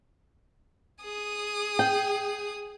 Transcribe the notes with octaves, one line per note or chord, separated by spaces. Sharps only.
G#4 D#6
G5